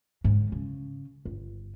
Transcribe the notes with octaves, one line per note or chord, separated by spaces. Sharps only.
G#2 D3
C#3
G1